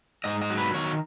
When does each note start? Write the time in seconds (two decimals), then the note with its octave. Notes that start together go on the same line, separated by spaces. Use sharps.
0.24 G#2 D#5
0.41 D#5
0.50 F#3
0.58 B4
0.74 D#3 C#5